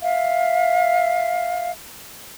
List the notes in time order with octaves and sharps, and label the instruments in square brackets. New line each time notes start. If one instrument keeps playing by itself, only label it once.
[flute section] E5 F5